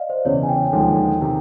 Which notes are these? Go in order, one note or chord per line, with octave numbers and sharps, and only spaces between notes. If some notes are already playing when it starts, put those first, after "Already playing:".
Already playing: D5 D#5 F5
C5
E2 C#3 E3 C#5
G#5
G5
D#2 D3 F3 G#3
C3 D#3